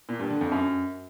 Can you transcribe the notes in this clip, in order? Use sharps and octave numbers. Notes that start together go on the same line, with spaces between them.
A#2
G2
D3
F2
F#2